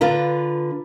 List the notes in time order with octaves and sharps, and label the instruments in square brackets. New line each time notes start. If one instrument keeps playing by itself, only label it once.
[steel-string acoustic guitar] D3 F4 B4 A#5